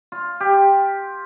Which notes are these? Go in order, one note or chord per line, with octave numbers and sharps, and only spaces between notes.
F4
G4